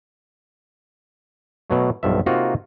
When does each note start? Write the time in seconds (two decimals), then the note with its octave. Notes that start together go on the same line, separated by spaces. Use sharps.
1.70 B2 F#3 A3
2.03 B1 G2 F3 E5
2.26 C3 A#3 D#4 F4 F#4